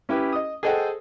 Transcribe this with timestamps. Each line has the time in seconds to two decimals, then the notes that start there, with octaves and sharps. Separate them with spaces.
0.09 C#4 E4 G4 B4
0.33 D#5 D#6
0.63 G#4 A4 C5 D#5 F#5 G5